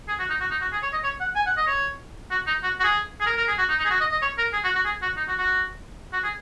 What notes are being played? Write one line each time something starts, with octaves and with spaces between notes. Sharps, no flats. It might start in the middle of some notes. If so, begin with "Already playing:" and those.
G#4
F#4
D#4
F#4
D#4
F#4
G#4
C#5
D#5
C#5
F#5
G#5
F#5
D#5
C#5
F#4
D#4
F#4
F#4
G#4
G#4
A#4
A#4
G#4
F#4
D#4
D#4
G#4
F#4
D#5
D#5
C#5
A#4
G#4
F#4
F#4
G#4
F#4
D#4
F#4
F#4
F#4
G#4